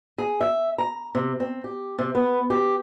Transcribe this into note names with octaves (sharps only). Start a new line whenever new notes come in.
G#4
E5
A#5
C3
C4
G4
C3
B3
G4